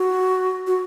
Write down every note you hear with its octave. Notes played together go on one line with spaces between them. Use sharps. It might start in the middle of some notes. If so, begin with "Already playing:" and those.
Already playing: F#4
F#4